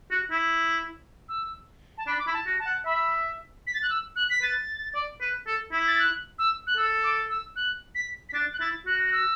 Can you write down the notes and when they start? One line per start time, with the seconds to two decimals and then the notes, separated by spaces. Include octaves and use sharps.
0.11 F#4
0.31 E4
1.29 E6
1.98 A5
2.07 D4 B5
2.19 D6
2.26 E4 B5
2.34 A5
2.46 F#4
2.59 A5
2.66 F#5
2.86 E5 B5
3.67 B6
3.74 A6
3.83 F#6
3.90 E6
4.16 F#6
4.30 B6
4.42 B4 A6
4.95 D5
5.21 B4
5.47 A4
5.72 E4
5.88 A6
5.99 F#6
6.39 E6
6.67 F#6
6.77 A4 E6
7.04 D6
7.30 E6
7.56 F#6
7.95 B6
8.29 B6
8.34 D4 A6
8.53 F#6
8.60 E4 A6
8.86 F#4 F#6
9.07 F#6
9.12 E6